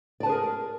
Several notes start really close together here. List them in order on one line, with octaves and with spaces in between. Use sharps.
D5 A5 B4 G#4 A#4